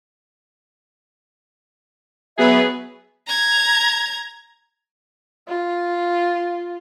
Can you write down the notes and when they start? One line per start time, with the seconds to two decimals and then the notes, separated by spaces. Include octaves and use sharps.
2.38 F#3 B3 G#4 B4 E5
3.27 A#5 G#6
5.48 F4